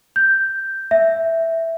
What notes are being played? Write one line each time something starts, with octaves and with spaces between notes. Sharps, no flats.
G6
E5